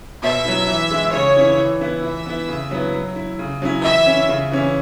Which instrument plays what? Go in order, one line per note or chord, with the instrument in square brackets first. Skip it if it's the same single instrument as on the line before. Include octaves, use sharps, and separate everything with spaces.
[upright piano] B2 [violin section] E5
[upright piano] F#3 E4
E3
G#3 E4
[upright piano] C#3 [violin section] C#5
[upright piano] E3 C#4 E4
E3
B3 E4
[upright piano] E3 [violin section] E5
[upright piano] B3 E4
C#3
F#3 B3 E4
F#3
E4
C#3
F#3 C#4 E4
[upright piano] E3 [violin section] E5
[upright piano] C#4 E4
C#3
E3 C#4 E4